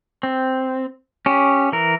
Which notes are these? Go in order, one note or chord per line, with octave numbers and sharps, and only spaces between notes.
C4
C#4 G4
E3 A#4